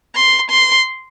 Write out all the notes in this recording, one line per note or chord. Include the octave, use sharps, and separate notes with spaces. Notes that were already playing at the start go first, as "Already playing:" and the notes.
C6
C6